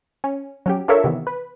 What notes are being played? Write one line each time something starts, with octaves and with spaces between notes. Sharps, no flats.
C#4
F#3 C#4 G4
D4 F4 A4 A#4 C#5 E5
C3 D#3 E3 B3
B4